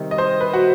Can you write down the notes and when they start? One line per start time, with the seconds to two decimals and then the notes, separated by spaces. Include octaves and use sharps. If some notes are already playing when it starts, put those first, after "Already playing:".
Already playing: C3 D#3 G3 C4 D#4
0.11 D#5
0.18 C5
0.41 B4
0.53 F#4